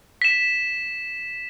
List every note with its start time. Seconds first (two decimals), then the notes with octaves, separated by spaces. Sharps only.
0.22 B6 E7